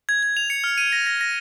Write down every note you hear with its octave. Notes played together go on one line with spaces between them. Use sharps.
G#6
G#6
F7
C#7
F6
D#7
A#6
A#6
A#6